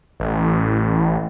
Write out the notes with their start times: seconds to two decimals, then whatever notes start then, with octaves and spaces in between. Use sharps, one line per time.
0.20 A1